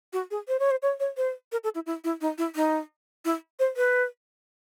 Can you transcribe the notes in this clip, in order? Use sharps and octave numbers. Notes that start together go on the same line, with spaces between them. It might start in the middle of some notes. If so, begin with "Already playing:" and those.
F#4
G#4
C5
C#5
C5
C#5
C#5
C5
A#4
A4
E4
E4
E4
D#4
E4
D#4
E4
C5
B4